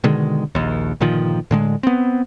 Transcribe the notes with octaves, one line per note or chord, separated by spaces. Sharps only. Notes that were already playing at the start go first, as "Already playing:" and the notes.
B2 D3 D#3 G#3
A#1 D#2
G1 A#2 D#3 F3
A2 D3 G#3
B3 C4